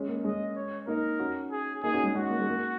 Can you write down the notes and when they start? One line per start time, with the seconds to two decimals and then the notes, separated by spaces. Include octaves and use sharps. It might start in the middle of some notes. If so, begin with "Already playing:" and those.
Already playing: G#3 C#4
0.08 A#3
0.24 G#3 C#4 D#5
0.56 C#5
0.87 A#3 D#4 A#4
1.19 C#4 F#4
1.51 G#4
1.83 A#3 D#4 G#4
1.93 C#4 F#4
2.04 G#3 C#4
2.14 G#3 C#4 F#4
2.30 A#3
2.40 G#3
2.49 A#3